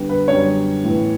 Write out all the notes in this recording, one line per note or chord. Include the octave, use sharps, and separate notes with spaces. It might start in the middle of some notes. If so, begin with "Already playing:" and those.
Already playing: D3 G3 B3
B4
F#2 D3 G3 B3 C#5
A2 E3 B3